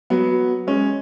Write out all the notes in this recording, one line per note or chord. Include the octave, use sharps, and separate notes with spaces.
F#3 B3
G#3 C#4